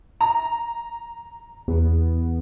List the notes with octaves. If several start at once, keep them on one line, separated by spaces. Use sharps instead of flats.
A#5
E2 B3